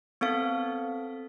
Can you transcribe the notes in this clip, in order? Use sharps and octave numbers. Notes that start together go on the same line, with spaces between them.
B3 C4 A4 F5